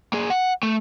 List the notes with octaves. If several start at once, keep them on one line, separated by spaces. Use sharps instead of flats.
A#3 G#4
F#5
A3